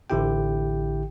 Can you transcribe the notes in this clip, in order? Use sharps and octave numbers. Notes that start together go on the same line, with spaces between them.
A1 D3 E4 G4 G5